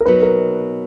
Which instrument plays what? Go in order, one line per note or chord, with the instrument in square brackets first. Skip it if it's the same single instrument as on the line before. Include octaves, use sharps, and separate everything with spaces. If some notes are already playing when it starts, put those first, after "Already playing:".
[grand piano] A#4
[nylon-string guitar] B2 F#3 B3 D#4 [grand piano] B4
[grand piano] A#4